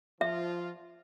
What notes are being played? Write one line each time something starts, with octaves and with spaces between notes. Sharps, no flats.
F3 F4 E5